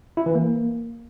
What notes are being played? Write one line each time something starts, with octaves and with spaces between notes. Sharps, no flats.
E4
E3
A#3